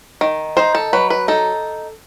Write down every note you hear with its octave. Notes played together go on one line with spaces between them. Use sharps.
D#3
D#4 C5
A4
F#3 B4
B4
D#4 A4